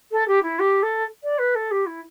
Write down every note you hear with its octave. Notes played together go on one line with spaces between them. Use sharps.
A4
G4
E4
G4
A4
D5
B4
A4
G4
E4